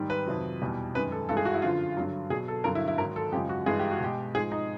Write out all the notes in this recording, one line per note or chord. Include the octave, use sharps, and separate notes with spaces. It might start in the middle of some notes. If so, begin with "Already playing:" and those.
Already playing: G#2 D#3 G3
B4
F2 C3 D#3 F#3
E2 B2 G3
F#2 D#3 G#3 B4
A4
G2 E3 G#3 A4
G#4
F#4
E4
F#2 D3 F3 F4
G2 D3 F#3
B2 F#3 G#4
A4
G2 D3 F#3 A#4
E4
E4
G#2 D#3 F#3 A#4
A4
F#2 C#3 F3 G#3 G4
F#4
G2 E3 G#3 G#4
G4
F#4
B2 G#3 G4
G#2 F3 G#3 G#4
D#4